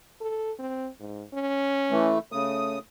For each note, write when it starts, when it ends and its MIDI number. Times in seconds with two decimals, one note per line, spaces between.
0.21 0.52 69
0.59 0.88 60
1.00 1.24 44
1.34 2.12 61
1.91 2.19 52
1.91 2.19 57
2.32 2.79 49
2.32 2.76 57
2.32 2.79 87